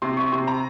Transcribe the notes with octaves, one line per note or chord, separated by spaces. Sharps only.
C3 C6
C#6
C3 C6
A#5